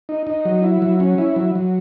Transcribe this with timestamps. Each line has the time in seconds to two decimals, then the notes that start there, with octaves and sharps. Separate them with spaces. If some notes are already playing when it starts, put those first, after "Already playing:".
0.09 D#4
0.27 D#4
0.45 F#3
0.63 E4
0.82 F#3
1.00 C#4
1.18 E4
1.36 F#3
1.55 F#3